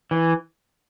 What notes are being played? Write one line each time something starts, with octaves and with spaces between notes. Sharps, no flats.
E3